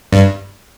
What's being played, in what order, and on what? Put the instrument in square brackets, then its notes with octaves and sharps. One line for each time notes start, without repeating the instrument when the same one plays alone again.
[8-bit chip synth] G2